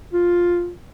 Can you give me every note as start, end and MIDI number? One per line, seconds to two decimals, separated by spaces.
0.13 0.71 65